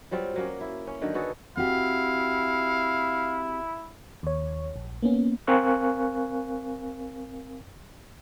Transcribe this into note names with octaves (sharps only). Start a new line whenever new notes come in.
F#3 G3 C4 F4
F#3 A#3 C#4
E4
C#4
D3 D#3 F#3 D#4
B3 F#4 G#4 A4
C4 E4 F#4 G4 F5
D#2 C#5
A#1
A#3 B3 C#4
C4 A#4 F5 G#5 C#6 F#6